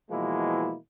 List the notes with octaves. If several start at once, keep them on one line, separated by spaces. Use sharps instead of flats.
B2 E3 F3 G#3 A#3 E4